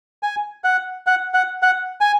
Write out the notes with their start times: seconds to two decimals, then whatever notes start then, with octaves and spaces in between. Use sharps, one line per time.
0.23 G#5
0.64 F#5
1.07 F#5
1.34 F#5
1.62 F#5
2.01 G#5